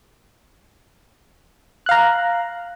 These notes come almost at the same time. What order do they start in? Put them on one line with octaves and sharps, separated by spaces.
F#6 F5 A#5